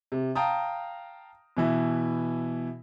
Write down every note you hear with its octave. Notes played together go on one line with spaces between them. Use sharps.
C3
F5 G5 A5 A#5 D#6
B2 E3 E4